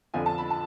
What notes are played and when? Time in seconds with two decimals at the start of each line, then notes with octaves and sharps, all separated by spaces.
0.14 F2 D3 F3 G#5
0.26 A5
0.38 B5
0.50 A5